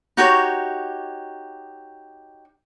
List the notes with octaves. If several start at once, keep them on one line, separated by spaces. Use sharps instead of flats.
D#4 F#4 G4 C#5